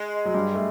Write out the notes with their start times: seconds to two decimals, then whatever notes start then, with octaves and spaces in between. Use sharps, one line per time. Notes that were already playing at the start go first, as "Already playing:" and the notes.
Already playing: G#3
0.25 F#3
0.34 G2 G3
0.54 A3